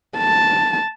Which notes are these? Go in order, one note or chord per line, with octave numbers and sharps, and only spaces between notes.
A5